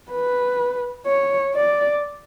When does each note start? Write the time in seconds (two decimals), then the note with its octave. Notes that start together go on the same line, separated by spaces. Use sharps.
0.11 B4
1.06 C#5
1.54 D5